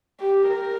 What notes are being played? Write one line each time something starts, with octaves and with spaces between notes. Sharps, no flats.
G4
A#4